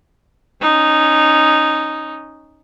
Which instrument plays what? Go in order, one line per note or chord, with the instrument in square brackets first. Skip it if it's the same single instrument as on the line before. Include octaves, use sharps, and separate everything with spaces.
[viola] C#4 D#4